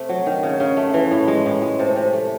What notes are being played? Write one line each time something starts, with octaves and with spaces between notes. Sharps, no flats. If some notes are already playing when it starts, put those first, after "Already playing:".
Already playing: C3 A3
F#3
D#3
C#3
C#3
A3
E3
A2
G#3
A2
G#3
C3 A4
C3
A3